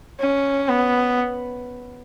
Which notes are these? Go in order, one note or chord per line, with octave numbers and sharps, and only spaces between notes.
C#4
B3